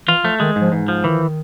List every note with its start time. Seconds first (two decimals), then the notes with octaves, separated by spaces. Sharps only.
0.08 E3 F4
0.24 F3 A3
0.40 D#3 G#3
0.56 G#2 F3
0.72 G#2 E3
0.88 F3
1.04 D#3 E3